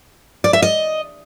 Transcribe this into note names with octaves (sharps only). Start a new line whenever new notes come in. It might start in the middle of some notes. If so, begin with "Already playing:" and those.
D5
E5
D#5